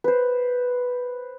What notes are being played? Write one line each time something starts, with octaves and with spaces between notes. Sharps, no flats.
B4 C5